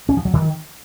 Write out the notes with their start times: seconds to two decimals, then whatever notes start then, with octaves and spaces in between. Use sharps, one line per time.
0.09 C#4
0.17 F3
0.25 F#3
0.33 D#3